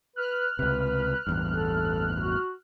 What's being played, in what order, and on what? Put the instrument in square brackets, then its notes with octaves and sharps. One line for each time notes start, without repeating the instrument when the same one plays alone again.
[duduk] B4 [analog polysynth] F6 F#6
[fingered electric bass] C#2 C3 [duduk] B4
[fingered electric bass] A1 E2 G2
[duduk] A4
F#4